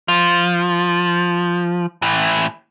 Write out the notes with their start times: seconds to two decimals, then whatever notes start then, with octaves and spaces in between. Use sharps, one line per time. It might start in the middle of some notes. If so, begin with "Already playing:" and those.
0.08 F3
2.02 A2 E3